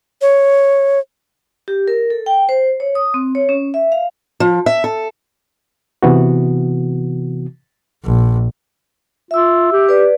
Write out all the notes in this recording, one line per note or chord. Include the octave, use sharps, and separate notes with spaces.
C#5
G4
A#4
A4
G5
C5
C#5
D#6
C4
C#5
C#4
E5
F5
F3
E5
A4
C3 E3 B3 F#4
A#1
F4 E5 E6
G4
B4 D5